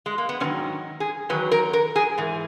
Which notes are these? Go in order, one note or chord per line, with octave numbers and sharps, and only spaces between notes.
G#3
A#3
B3
G#2 D#3 F#3 C#4
G#4
E2 D#3 F#3 B4
A#4
A#4
G#4
G#2 E3